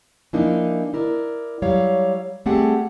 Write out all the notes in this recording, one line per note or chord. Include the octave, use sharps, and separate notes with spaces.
E3 F3 A#3 D4 D#4
E4 A#4 D5
F#3 G3 C#5 F5
G3 A3 C4 G4 G#4 F#5